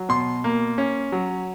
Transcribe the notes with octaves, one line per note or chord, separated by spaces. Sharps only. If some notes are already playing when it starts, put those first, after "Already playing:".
Already playing: F#3
B2 C6
A#3
C#4
F#3